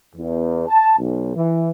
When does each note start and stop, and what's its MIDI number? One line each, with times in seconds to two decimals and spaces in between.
0.16 0.64 40
0.69 0.95 81
0.98 1.36 35
1.36 1.70 52